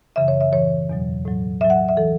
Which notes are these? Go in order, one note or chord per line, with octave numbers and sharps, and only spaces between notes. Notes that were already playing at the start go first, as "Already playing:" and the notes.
F#2 C#3 E3 E5
C#5
E5
A2 E3 C#5
E2 B2 F#3
A2 F#3
A2 F#3 E5
F#5
E5
E3 A4